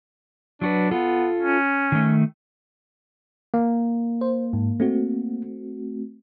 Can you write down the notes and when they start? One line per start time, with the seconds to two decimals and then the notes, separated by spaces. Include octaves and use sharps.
0.61 F#3 D4 F#4 B4
0.91 B3 F4 A4
1.38 C#4
1.92 D#3 A3
3.54 A#3
4.21 C5
4.53 G#2
4.80 A3 C4 F#4